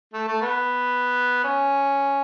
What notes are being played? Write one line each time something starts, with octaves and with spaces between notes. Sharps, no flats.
A3
A3
B3
C#4